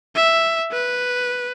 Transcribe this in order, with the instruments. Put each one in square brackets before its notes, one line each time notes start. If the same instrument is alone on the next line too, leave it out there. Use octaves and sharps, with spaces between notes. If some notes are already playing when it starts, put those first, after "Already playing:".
[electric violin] E5
B4